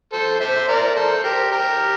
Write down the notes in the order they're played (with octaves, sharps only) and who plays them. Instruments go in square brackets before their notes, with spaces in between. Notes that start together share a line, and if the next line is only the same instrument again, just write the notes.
[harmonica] A4 C5
C5 E5
A#4 D5
A4 C5
G4 A#4
G4 A#4